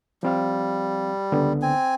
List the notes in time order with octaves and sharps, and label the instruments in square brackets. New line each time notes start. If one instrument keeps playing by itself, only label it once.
[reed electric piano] F3 C4 F5 [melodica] G3
[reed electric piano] C#2 D3 B3
[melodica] C4 G#5